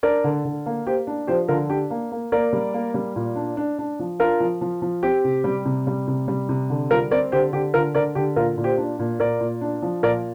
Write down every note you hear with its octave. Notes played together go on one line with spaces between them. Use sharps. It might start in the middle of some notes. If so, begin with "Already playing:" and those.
D4 A#4 D5
D3
D3
A#3
A#3 G4 C5
D4
F3 G4 C5
D3 F4 A#4
D4 G4
A#3
A#3
A#3 A#4 D5
G3
A#3
G3
A#2
D4
D4
D4
F3
D4 F4 A#4
F3
F3
F3
C4 G4
C3
G3
C3
G3
C3
G3
C3
D3
G3 F4 A#4
C4 A#4 D5
D3 G4 C5
D3 G4
D3 F4 A#4
D3 A#4 D5
D3 G4
A#2 F4 A#4
A#2
G4 C5
D4
A#2
A#2 A#4 D5
A#2
D4
F3
A#2 A#4 D5